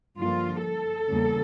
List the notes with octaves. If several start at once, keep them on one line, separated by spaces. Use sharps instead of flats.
G2 D3 F3 A#3 F4
A4
E2 C#3 G3 A#3